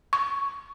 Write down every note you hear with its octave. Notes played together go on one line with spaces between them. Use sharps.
C#6